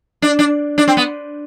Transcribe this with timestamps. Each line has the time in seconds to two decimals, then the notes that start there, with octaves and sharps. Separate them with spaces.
0.22 D4
0.39 D4
0.78 D4
0.88 C4
0.97 B3